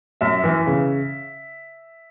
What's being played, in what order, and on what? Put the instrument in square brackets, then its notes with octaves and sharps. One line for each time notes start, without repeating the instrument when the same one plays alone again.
[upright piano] F#2 E5
E3
C#3